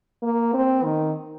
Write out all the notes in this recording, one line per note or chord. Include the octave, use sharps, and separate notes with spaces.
A#3
C4
D#3